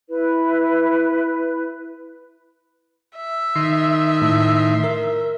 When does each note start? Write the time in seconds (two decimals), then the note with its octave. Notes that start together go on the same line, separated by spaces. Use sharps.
0.10 E4 B4
3.17 E5
3.55 D#3 C6
4.22 A2
4.84 A#4